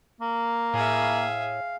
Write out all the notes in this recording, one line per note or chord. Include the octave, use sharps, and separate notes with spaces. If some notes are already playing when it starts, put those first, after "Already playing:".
A#3
A2 G#4 E5 F5